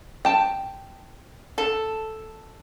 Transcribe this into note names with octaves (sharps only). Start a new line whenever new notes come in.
G5 A5
A4